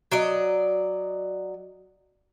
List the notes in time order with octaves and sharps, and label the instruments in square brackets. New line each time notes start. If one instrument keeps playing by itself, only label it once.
[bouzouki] F#3 D5 D#5